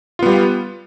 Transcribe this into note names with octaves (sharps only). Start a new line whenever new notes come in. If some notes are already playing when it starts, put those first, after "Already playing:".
G3 B3 F4